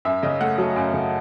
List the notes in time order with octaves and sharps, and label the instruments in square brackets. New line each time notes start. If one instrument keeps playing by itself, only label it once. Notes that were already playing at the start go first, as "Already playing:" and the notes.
[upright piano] F#2 E5
C#3 D#5
A3 F#5
F#3 A4
F#2
C#3